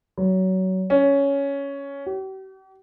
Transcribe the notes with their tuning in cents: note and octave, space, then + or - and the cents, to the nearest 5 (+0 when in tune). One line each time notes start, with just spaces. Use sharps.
F#3 +20
C#4 +10
G4 -45